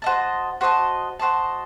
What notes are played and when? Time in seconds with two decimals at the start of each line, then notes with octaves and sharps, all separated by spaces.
0.02 F#4 C5 D#5 A5
0.61 F#4 C5 D#5 A5
1.20 F#4 C5 D#5 A5